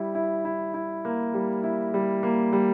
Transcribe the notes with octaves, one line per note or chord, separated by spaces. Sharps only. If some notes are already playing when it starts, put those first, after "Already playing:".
Already playing: G3 E4
E4
E4
E4
A#3
G3
E4
G3
A#3
G3